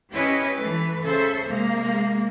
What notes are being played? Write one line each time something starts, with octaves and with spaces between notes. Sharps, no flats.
C#4 E4 G4 B4 D#5
E3 A3 B4
C#3 A4 C5 E5
C3 G#3 A#3